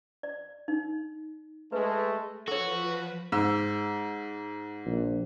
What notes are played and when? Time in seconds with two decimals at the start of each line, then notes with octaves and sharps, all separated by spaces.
0.23 D5
0.68 D#4
1.72 G#3 A3 B4
2.48 F3 F#4 A4 B4 C#5
3.32 G#2 E6
4.86 A#1